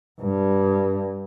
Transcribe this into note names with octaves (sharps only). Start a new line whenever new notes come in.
G2